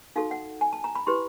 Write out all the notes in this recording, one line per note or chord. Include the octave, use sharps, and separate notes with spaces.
D#4 F#4 A4 F5
F#5
G#5
A5
A#5
B5
E4 G4 B4 C6